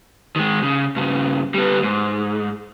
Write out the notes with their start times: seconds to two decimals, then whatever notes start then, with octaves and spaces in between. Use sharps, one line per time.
0.36 D#3 G#3
0.63 C#3
0.96 G2 C#3
1.54 G3 B3
1.79 D2 G#2